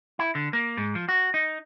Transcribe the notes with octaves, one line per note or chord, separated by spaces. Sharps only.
E4
D3
A#3
G#2
F3
F#4
D#4